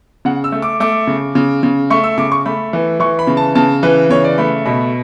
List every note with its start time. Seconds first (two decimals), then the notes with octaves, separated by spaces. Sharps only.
0.25 C#3 F#5
0.44 E6
0.52 A3
0.62 D6
0.80 A3 D6
1.07 C#3
1.35 C#3
1.63 C#3
1.90 A3 C#6
2.04 E6
2.18 C#3 D6
2.32 C#6
2.46 A3 B5
2.73 E3
3.00 E3 C#6
3.19 B5
3.27 C#3
3.37 A5
3.55 C#3 A5
3.83 E3 B4
4.10 C#3 C#5
4.24 D5
4.38 A3 B5
4.66 B2 B5